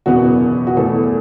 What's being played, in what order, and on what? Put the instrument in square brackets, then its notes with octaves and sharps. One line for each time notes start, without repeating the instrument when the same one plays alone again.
[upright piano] F#1 E2 B2 B3 F#4
F#4
E2 B2 A3 A4